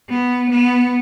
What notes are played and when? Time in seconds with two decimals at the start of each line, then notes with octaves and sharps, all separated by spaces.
0.10 B3
0.49 B3